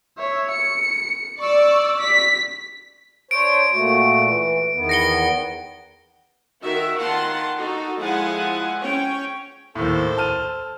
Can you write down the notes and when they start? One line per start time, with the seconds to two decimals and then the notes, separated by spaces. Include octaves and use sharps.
0.18 C#5 E5
0.51 C#7
1.40 D5 C#6 E6
2.00 B6
3.31 D4 C5 C#5 D7
3.73 A#2 A3 F#4
4.25 E3
4.75 E2 D#3 B3
4.89 A#6 C#7 G7
6.63 D#3 F#4 A#4 E5
6.98 D#3 F4 F#5 A5 C6
7.58 D#4 F#4 A4
8.01 F3 G#3 E4 F#5 G#5
8.81 C#4 C#5 G5
9.75 D#2 A2 A4 C5
10.18 A5 F6 D#7